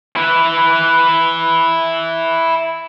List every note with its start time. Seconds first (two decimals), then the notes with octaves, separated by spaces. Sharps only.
0.16 E4 B4